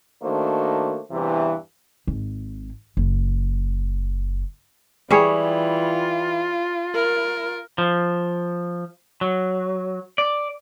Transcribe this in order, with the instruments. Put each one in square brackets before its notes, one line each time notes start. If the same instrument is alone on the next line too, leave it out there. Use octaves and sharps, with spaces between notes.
[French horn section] D#3 A3 A#3 D4 F#4 C5
E2 G2 C3 E3
[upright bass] G#1
F#1
[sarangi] E3 [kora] G3 G#4 C#5
[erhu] F4
[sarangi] A#4
[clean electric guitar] F3
F#3
D5